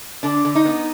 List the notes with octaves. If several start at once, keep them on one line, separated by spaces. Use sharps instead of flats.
D3 D4
D3
D#4
B3